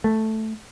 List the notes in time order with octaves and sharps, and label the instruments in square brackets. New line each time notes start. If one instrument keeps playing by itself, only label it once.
[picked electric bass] A3